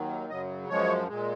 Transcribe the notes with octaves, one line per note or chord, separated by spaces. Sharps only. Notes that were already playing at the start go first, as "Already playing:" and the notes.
Already playing: D#2 D#3 F#3
F#2 C#3 F#3 D#5
F#2 F3 G#3 C#5
A#2 G#3